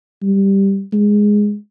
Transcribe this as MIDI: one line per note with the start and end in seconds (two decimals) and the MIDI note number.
0.22 0.83 55
0.93 1.56 56